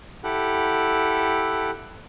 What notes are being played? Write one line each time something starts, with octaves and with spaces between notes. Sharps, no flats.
E4 G4 A4 F#5